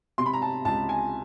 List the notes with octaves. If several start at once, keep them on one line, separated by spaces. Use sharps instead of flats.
C3 C6
B5
A#5
A5
C#2 A5
G#5